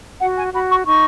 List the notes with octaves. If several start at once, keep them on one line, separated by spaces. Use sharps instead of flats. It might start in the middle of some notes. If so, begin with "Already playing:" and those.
F#4 F#5
G#5
F#4 B5
C#6
D#4 C#6